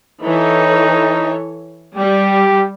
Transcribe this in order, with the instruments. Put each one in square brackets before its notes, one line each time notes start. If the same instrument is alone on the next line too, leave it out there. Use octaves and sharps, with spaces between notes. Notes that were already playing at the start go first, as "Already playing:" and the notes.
[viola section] E3 A4 C#5 [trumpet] D#4
[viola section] G3 [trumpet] G4